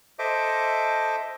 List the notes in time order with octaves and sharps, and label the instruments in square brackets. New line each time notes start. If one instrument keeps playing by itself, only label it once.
[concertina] A4 C5 D#5 E5 D6